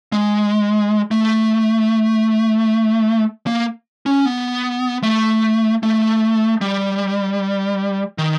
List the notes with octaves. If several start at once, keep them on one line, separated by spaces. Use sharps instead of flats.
G#3
A3
A#3
C#4
B3
A3
A3
G3
D#3